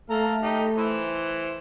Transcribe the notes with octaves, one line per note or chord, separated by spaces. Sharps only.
A3 A4 F5 A#5
D#4 G4
E3 E4 C5